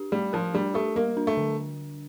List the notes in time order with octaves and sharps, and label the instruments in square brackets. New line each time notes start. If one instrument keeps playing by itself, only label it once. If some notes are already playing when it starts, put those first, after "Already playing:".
Already playing: [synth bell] D4 G4
[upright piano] G3 [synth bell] A3
[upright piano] F3 [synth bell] A#4
[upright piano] G3 [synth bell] D4
[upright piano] A3 [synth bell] G4
[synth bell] G3 [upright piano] A#3
[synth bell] D4
[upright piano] A3
[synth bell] D3